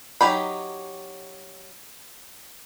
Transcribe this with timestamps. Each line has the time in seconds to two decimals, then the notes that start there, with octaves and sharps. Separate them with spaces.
0.21 F#3 D#4 G4 B5